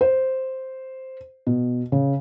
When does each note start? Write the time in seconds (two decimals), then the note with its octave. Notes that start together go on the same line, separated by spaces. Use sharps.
0.01 C5
1.47 B2
1.92 C#3